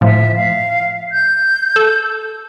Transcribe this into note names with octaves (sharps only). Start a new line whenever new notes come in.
A2 F3 E5
F5
G6
A4